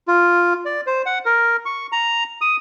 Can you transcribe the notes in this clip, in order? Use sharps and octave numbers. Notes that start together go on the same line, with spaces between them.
F4
D5
C5
F#5
A#4
C#6
A#5
D#6